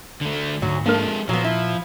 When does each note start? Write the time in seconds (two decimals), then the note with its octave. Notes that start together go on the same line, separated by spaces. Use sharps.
0.21 D3 A3
0.62 D2 G#2 F#3
0.86 F3 G#3 A#3 D4 A4 A#4
1.29 A#2 F3 F#3 B3
1.44 E4